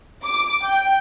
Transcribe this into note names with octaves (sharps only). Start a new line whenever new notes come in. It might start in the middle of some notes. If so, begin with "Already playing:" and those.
D6
G5